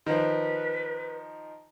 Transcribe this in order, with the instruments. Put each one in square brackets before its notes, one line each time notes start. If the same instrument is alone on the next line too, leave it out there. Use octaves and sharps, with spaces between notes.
[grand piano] D#3 F3 [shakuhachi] B4